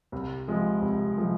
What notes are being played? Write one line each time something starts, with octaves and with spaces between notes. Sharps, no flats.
C2
C3 F3 G#3
C2
C3 F3 G#3